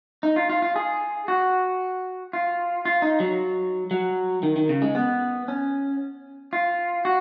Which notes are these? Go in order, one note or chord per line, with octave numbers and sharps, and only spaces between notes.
D#4
F4
F4
F4
G#4
F#4
F4
F4
D#4
F#3
F#3
D#3
D#3
C#3
G#3
B3
C#4
F4
F#4